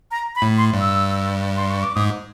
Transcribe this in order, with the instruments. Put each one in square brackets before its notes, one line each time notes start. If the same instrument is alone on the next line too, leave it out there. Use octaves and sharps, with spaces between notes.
[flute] A#5
B5
[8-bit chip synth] A2
[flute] C6
[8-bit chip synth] G2
[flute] E6
C6
C#6
D6
[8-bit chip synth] G#2 [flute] D#6